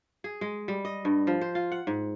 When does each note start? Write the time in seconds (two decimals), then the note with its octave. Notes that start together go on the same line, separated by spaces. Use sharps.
0.24 G#4
0.41 G#3
0.68 G3
0.85 D#5
1.05 G2
1.27 F3
1.41 C5
1.55 F4
1.72 F#5
1.87 G#2